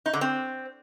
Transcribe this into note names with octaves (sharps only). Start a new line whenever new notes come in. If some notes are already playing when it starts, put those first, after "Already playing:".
D#4
D3
C4